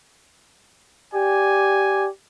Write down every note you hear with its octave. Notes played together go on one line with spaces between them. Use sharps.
G4 D5 G#5